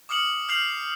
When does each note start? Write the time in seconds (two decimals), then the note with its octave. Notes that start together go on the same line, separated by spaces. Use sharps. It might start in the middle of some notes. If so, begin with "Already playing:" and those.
0.09 D6 D#6 F6 C#7 F#7
0.49 F6 G6 C7 F7 F#7